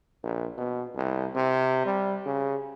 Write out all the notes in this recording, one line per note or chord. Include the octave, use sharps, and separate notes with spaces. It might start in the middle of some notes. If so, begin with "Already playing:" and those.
A#1
B2
C2
C3
G3
C#3